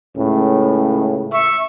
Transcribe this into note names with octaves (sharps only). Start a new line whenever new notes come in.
C#2 A2 C#3
E5 C#6